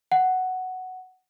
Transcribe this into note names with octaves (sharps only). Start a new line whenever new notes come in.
F#5